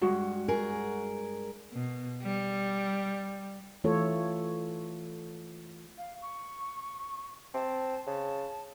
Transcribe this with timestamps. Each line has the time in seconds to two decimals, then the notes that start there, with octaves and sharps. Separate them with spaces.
0.02 G2 G#3 F#4
0.48 G#4 A#4
1.72 B2
2.22 G3
3.84 E3 A3 F4 A4 C#5
5.98 F5
6.22 C#6
7.54 C4 A5
8.06 C#3 A5